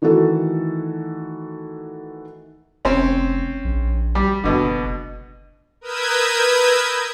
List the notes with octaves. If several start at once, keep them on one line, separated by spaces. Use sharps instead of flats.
D#3 E3 A3 F#4 A4
F1 C4 C#4
A#1
G3
F#1 B2 D3
A#4 B4 D#6 E6 G6 G#6